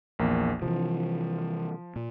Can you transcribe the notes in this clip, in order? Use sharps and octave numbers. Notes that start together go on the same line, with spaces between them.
A#1 E2 A#3
C3 E3 F3
A#2